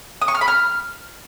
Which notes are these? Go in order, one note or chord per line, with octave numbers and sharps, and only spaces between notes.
D#6
C#6
F6
B5
F6